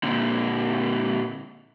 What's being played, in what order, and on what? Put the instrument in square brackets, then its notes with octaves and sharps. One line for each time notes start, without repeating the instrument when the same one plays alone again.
[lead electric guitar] A#2 D3